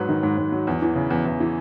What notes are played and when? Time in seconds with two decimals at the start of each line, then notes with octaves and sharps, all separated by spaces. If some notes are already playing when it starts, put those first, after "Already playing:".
Already playing: G#2 F#3 B4
0.09 D#3
0.23 G#2
0.38 G#2
0.52 F#3
0.67 E2
0.82 E3
0.95 C#3
1.10 E2
1.25 E2
1.40 E3